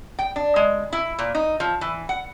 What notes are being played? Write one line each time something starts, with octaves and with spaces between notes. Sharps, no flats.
G5
D4
G#3
E4
A#2
D#4
F3
E3
F#5